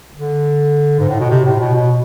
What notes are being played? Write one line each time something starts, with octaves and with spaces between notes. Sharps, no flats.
D3
G#2
A2
B2
C3
A2
B2
B2